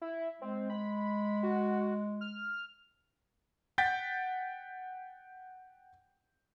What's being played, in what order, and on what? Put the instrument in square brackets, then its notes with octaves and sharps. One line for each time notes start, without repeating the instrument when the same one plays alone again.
[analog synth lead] E4
[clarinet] G#3 [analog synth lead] C4
[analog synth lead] B5
F#4
F6
[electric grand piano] F#5 G5 G6 A6 B6